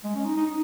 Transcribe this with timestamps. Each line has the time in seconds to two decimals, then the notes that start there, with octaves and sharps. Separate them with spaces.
0.04 G#3
0.15 C#4
0.25 D#4
0.36 D#4
0.46 D#4